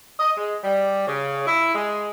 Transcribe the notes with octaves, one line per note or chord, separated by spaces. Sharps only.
D#5
G#3
G3
C#3
E4
G#3